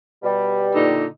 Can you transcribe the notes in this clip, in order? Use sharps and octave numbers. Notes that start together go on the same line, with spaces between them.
B2 G3
A#2 D3 D#4